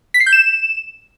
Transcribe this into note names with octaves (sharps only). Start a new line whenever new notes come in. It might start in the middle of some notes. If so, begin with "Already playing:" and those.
B6
C7
G6
E7